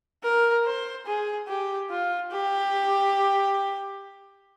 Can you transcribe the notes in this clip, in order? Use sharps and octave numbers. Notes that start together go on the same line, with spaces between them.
A#4
C5
G#4
G4
F4
G4